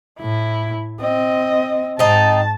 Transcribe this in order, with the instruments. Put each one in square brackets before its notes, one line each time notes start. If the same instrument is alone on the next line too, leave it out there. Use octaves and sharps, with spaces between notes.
[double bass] A2 [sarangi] E4
[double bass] C4 [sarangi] D#5
[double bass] G#2 [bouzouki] C4 D#4 [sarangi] A5